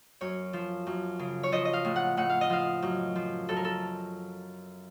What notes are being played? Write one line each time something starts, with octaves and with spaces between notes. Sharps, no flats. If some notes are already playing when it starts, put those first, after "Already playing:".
F#2 C#5
F3
F#2
C#3
C#5
F3 D#5
D#5
F5
A2
F#5
A2 F#5
F5
D#5
F3 F5
F#2
F3
F#2 A4
A#4
A4